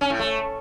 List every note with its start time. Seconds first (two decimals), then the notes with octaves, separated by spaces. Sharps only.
0.01 C#4
0.10 A2
0.19 A3